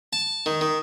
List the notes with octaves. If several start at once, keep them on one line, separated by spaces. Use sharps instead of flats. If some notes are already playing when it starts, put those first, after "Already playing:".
A5
D#3
D#3